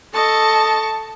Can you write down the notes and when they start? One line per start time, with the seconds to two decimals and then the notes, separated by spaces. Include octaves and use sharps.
0.14 A4 D#5 A5 C#6